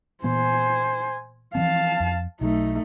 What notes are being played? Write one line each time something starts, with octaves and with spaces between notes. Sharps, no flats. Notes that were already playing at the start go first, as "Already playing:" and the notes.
A#2 E3 B3 C5 G#5
E3 F3 C4 F5 A5
F2
B1 F#3 A3 D#4